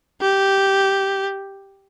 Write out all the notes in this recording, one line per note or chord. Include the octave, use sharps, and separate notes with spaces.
G4